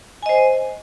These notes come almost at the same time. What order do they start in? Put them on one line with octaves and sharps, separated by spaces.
G#5 D#5 C5